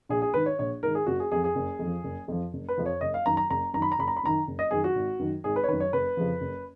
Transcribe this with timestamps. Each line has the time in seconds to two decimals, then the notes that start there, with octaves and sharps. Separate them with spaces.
0.09 A#1 G#4
0.22 G#4
0.34 G#2 D#3 B4
0.46 C#5
0.59 A#1 C#5
0.83 G#2 D#3 A#4
0.95 G#4
1.07 F#1 F#4
1.20 G#4
1.31 F2 F3 G#4
1.44 G#4
1.55 F#1
1.79 F2
1.85 F3
2.04 F#1
2.28 F2 F3
2.53 F#1
2.69 B4
2.78 F2 F3
2.86 C#5
3.01 F#1 D#5
3.14 F5
3.26 F#2 D#3 A#5
3.37 A#5
3.50 F#1 A#5
3.74 F#2 D#3 A#5
3.82 B5
3.92 A#5
3.98 F#1 B5
4.08 A#5
4.17 B5
4.23 F#2 D#3 A#5
4.47 F#1
4.59 D#5
4.71 F#2 D#3 G#4
4.84 F#4
4.95 G#1
5.19 F#2 D#3
5.44 G#1 G#4
5.56 B4
5.64 C#5
5.68 D#3 B4
5.73 F#2
5.80 C#5
5.93 F#1 B4
6.17 F2 C#3 F3
6.41 F#1